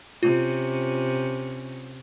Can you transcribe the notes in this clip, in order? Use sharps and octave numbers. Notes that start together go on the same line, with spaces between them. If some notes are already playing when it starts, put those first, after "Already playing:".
C3 C#4 F4